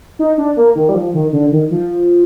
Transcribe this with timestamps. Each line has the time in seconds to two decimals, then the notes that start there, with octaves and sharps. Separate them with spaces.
0.19 D#4
0.38 D4
0.57 A#3
0.75 D#3
0.89 G3
0.94 F3
1.14 D#3
1.32 D3
1.52 D#3
1.71 F3